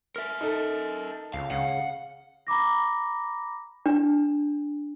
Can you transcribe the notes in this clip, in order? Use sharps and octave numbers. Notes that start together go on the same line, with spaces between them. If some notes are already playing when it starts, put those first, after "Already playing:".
A#4 E5 F6
D#4 A4
C#2 F5
C#3 F5 F#5
A#5 B5 D6 A#6
D4